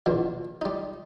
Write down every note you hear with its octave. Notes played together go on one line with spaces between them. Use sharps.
A#1 E2 B2
G3 D#4